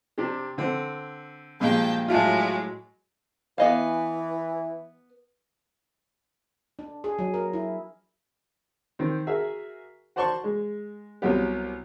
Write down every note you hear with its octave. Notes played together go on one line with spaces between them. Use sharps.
C3 D4 G4
D3 C4
G2 A#2 F3 G#3 G5 A5
A2 F#3 G#3 F4 E5 A5
E3 B3 D#5 F5
D4
G#4
F#3
A#4
E4
D#3 C4
F#4 G#4 A#4 E5
F#4 C5 D5 A5 C6 C#6
G#3
C2 C3 F#3 B3 G4